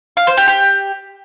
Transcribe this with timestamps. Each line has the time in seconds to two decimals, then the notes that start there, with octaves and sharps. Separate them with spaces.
0.17 F5
0.27 C5
0.37 G4
0.48 G4